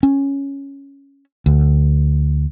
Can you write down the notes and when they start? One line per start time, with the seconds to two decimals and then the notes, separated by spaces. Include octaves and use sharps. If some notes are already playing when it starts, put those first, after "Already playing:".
0.03 C#4
1.46 D2